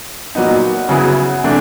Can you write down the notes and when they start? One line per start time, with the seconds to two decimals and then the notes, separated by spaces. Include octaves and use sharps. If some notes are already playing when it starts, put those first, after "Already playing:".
0.35 A#2 F#3 B3 D#4
0.89 C#3 F#3 B3 E4 G#4
1.44 C3 E3 A3 D4